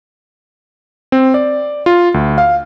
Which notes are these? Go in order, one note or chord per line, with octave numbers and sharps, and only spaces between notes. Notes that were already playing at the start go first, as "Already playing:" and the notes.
C4
D5
F4
D2
F5